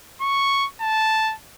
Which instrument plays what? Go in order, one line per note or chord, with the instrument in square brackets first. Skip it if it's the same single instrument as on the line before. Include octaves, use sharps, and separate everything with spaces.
[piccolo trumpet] C#6
A5